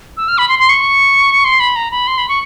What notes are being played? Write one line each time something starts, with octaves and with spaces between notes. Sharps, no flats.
E6
F6
B5
C6
C6
C#6
C6
B5
A#5
B5
C6
B5
C#6